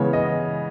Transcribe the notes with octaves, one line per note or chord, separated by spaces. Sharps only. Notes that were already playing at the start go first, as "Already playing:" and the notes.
Already playing: C#3 E3 G#3 B3 C#5
D#5